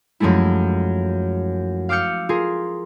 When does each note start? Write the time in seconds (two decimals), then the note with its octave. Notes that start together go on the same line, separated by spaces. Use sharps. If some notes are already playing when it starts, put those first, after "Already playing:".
0.20 F#2 F3 G#3 A3 E4
1.89 F5 D6 E6 F6 G6 C#7
2.29 F4 G#4 A#4